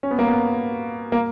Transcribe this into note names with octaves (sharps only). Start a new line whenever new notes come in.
C#4
B3
A#3
B3
A#3